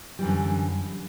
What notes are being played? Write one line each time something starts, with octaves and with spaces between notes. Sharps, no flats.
F#2 D3 E3 G3